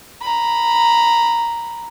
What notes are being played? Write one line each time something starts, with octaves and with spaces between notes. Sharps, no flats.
A#5 B5